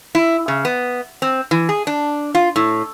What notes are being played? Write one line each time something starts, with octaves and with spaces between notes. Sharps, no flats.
E4
C#3
B3
C4
E3
G#4
D4
F4
A2